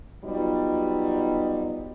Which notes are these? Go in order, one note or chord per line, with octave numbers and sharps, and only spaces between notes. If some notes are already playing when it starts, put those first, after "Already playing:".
F#3 G3 B3 D#4 F4